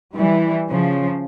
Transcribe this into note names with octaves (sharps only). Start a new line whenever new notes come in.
E3 G3
C#3 F3